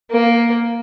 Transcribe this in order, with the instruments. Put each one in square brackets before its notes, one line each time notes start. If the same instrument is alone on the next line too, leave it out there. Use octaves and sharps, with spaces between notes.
[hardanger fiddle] A#3